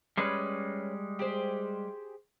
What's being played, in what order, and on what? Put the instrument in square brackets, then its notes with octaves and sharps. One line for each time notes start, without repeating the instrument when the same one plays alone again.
[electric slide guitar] G3 G#3 [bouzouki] C#4 B4
[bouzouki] G4 G#4 C5